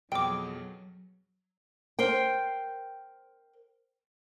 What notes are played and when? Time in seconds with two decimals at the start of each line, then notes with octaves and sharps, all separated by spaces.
0.12 F2 B2 F#3 G#4 G5 D6 D7
1.99 A#4 C5 G5